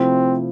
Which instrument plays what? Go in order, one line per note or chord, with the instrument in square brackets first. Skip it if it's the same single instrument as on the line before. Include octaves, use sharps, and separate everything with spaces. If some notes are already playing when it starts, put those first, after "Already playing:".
Already playing: [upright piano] C3 F3 A3 E4 [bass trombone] C4